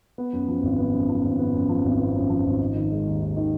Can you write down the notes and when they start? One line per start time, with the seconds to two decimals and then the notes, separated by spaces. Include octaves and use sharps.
0.18 B3
0.33 F#2
0.48 F3
0.63 G#1
0.78 B3
0.94 F#2
1.09 F3
1.24 G#1
1.39 B3
1.54 F#2
1.69 F3
1.84 G#1
1.99 B3
2.15 F#2
2.30 F3
2.46 G#1
2.61 D#4
2.75 D#3
2.91 G#3
3.06 D#2
3.21 D#4
3.37 D#3